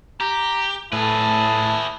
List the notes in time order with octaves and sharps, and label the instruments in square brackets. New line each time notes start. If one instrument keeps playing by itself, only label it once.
[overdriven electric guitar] G4 [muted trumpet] A#5
[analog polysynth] A2 [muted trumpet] E4 [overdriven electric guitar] G#4 B4 [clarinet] A5